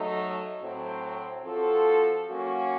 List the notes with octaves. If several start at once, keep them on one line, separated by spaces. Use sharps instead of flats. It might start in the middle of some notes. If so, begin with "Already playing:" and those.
Already playing: F#3 A3 D#4
A2 F#3 C4
F3 C4 F#4 A4
F#3 A#3 C#4 F#4